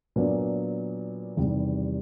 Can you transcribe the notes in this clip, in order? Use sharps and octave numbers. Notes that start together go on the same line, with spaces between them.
A#2 F#3 B3 D4
E2 C3 D#3 G3